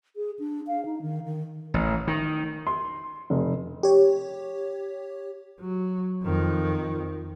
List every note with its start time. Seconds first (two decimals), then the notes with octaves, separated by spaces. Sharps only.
0.16 G#4
0.39 D4
0.67 F5
0.85 D#4
1.02 D#3
1.25 D#3
1.74 A1
2.07 D#3
2.67 C6
3.30 F1
3.83 G4 C#5
5.60 F#3
6.23 F2 D#3